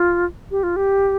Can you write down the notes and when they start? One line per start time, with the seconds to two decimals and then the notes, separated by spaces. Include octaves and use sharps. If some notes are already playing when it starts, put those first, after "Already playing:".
Already playing: F4
0.51 G4
0.63 F4
0.76 G4